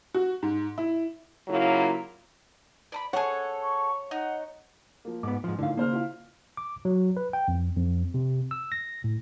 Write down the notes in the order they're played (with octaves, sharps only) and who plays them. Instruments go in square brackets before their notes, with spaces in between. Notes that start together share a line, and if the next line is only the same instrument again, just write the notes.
[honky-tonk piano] F#4
G#2
E4
[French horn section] C#3 F#3 A#3 E4 F4
[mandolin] D5 A#5 B5
[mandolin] G#4 A4 F#5 [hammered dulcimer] C#5
[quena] C#6
[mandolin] D#4 [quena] F#5
[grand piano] F3 A#3
[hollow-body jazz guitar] G#2 B3 [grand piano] D6
[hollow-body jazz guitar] G#2 F3
[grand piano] A2 D#3 F3 [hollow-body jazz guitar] D3 F5
[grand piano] C#3 C5 F6 [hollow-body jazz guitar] A#3
[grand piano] E4 F4 F5
[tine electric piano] D6
F#3
B4
G5
F2
F2
C3
E6
A#6
A2